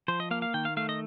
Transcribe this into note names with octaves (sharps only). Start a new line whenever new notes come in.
F3 C5
D#5
A#3 F5
F5
D#3 G5
F5
A3 F5
D#5